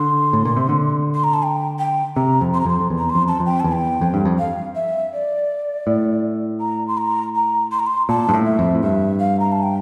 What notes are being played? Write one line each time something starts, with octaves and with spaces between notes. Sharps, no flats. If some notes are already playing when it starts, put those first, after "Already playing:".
Already playing: D3 C6
A2
A#2
C3
D3
C6
A#5
A5
G5
G5
C3 A#5
F2
C6
A#5
F2 C6
F2
E2
A#5
C6
F2
A5
F2
G5
E2 A5
G5
F2
G2
F2
F5
E5
D5
A2
A#5
C6
A#5
A#5
C6
A#5
C6
A#2 A5
G2
A2
E5
F2
A2
G2 E5
F5
A#5
A5
G5